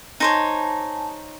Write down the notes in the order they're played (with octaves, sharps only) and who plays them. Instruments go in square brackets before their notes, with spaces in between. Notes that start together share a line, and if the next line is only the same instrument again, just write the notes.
[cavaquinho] D#4 C5 C#5 [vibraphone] G#5 A5